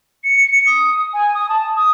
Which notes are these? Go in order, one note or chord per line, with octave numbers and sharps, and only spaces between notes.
C#7
C#7
D#6
G#5
D#6
A5
D#6